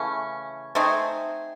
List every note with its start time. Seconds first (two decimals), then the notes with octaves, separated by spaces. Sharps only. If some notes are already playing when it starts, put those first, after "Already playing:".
Already playing: C#3 E3 A3 C#4
0.75 A3 C4 D#4 G#4